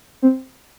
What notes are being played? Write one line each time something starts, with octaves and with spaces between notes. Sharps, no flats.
C4